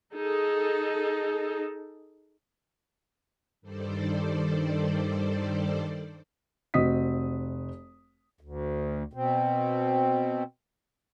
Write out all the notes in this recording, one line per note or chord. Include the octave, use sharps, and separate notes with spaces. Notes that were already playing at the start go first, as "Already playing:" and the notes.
D#4 G#4 A4
G2 D#3 G3 A4 C5 D5
F1 C4 F#4 D#5 D#6 B6
D2
B2 C4